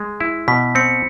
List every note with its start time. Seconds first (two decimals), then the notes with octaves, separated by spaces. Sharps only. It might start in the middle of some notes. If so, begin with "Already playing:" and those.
Already playing: G#3
0.20 E4
0.48 B2 B6
0.75 C4 C#7